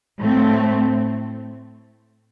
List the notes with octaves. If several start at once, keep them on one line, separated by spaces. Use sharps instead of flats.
A2 A3 C4